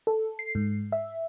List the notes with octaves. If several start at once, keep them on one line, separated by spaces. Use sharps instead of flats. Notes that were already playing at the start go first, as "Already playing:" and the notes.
A4
C7
G#2
E5